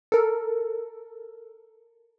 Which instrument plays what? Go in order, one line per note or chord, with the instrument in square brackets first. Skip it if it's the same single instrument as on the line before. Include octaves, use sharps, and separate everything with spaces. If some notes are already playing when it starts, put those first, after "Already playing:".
[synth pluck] A4 A#4